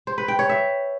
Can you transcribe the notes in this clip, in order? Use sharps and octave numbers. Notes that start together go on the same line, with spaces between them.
C5
B4
G5
C#5
E5